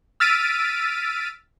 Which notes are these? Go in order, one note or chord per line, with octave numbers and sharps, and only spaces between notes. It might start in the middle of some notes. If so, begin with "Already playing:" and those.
E6 F6 A6 B6 D7 D#7